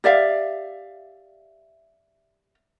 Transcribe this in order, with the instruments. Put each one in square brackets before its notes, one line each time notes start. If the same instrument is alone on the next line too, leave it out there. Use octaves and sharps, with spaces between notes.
[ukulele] G4 D5 E5 F5